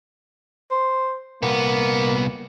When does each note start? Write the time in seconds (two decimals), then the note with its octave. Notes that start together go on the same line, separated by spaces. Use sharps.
0.71 C5
1.43 C2 A#3 B3